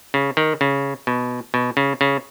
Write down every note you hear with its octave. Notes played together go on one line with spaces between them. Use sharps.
C#3
D#3
C#3
B2
B2
C#3
C#3